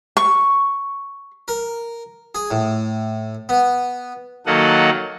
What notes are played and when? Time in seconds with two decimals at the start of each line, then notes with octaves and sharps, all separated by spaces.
0.17 C#6
1.48 A#4
2.35 G#4
2.51 A2
3.49 B3
4.46 D#3 F#3 A#3 A4 D#5 F#5